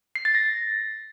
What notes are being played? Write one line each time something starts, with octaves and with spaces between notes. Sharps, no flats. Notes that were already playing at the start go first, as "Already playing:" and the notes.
C7
A6
A#6